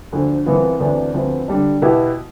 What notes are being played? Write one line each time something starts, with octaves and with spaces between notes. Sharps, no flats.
D2 D3 F3
C2 C3 E3 B3 F4
D2 C3 E3 B3 D4
D2 C3 F3 B3
D3 G3 D4
B2 B3 E4 G4